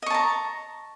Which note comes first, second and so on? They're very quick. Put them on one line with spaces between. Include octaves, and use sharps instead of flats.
D#5 C#6 A5 A#5